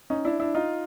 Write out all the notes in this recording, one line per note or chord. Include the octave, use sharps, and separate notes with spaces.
C#4 D#4
D4 E4
D4 E4
D#4 F4